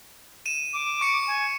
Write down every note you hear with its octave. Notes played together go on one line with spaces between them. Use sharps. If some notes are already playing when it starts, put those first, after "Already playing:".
D#7 E7
D6
C#6 C#7
G#5